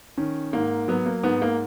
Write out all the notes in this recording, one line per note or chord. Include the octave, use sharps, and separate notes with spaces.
D#3 C#4
G#2 A#3
F#3 B3
A#3
G#2 B3
A#3